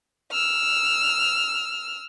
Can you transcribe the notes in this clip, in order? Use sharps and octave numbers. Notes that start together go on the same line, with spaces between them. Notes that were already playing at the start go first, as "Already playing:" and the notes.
E6 F6